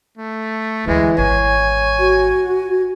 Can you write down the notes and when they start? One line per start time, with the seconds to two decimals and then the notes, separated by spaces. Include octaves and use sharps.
0.18 A3
0.87 D2 E3 F#3 G#3
1.18 G#1 E3 C#5 G#5
1.99 F#4